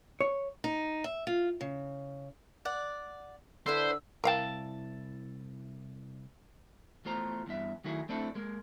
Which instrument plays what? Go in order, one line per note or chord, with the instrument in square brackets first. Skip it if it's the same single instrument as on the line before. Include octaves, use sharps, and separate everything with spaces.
[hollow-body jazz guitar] C#5
[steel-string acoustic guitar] D#4
E5
F4
C#3
[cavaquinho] D5 F#5
[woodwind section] D3 [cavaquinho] E4 B4 B5 [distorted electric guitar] C5 [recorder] E6
[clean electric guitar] C2 E4 A5 [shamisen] A#4 F5 G5
[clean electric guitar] E2 A3 F4 C5 A#5
E2 G2 E5
D#3 F#3 A3 E4 G#4
A3 C4 D4 E4 A4
G#3 A#3